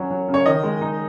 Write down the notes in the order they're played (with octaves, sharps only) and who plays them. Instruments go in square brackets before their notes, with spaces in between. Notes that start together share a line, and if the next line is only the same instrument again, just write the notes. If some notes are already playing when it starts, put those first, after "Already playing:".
Already playing: [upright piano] F#3 C#4
F#3
C#3
C#5
D#3 D#5
G#3
D#4